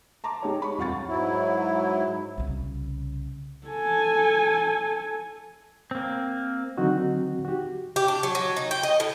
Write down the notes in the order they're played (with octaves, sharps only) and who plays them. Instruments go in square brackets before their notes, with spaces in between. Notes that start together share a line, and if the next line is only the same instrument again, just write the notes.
[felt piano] A5 A#5 C6 D6
G#3 D#4 G4 G#4 C#5
C#5 B5 C#6
D#1 F2 F4 F#5 C#6 A6
[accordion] G#2 F#3 E4
[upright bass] C2 C#3
[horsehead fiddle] A4 G#5
[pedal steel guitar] A#3 C4
[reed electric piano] D3 D#3 F#3 C4 D#4 F#4
F#4 G4
[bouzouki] G4
D4
F#3
F#3
D#4
G5
D#5
A2